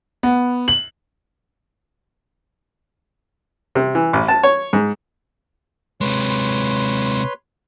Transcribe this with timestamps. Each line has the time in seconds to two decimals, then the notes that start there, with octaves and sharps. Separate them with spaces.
0.23 B3
0.68 F#7
3.75 C3
3.95 E3
4.13 A1
4.28 A5
4.43 C#5
4.73 G#2
6.01 C3 G#3 B4 C#5 C6